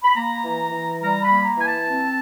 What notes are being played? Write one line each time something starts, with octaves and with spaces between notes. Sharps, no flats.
B5
A#3 A#5
E3
E3
G3 A#5
B5
A#3
A#5
E3 G#5
A5
C4